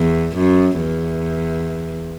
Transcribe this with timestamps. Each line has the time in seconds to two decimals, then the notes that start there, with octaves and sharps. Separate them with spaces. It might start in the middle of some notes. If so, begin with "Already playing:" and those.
Already playing: E2
0.37 F#2
0.81 E2